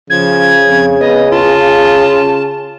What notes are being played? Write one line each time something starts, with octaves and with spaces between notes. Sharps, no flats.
C#3 F3 G#6
F2
B3 D#5
F4 A5